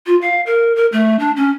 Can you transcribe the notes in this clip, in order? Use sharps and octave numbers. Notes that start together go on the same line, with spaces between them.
F4
F5
A#4
A#4
A3
D4
C#4